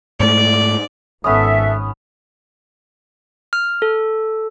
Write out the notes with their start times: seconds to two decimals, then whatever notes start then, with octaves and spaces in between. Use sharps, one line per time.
0.20 G#2 A3 D5
1.24 G#1 B3 C#4 A4 E5 D#6
3.53 F6
3.82 A4